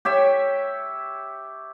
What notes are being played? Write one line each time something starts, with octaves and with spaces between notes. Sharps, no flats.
G4 C#5 E5